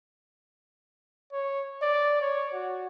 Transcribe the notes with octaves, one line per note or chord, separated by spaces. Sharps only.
C#5
D5
C#5
F#4